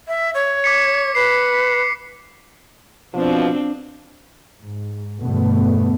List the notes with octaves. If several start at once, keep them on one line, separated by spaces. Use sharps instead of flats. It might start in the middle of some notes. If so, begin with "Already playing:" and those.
E5
C#5
D6 B6 C#7
B4 C7
B2 F3 C4 D4
G#2
E2 G2 B2 D3 A3 B3